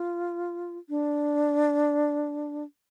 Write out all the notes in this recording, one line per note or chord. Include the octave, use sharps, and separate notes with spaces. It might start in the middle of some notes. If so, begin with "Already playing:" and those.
Already playing: F4
D4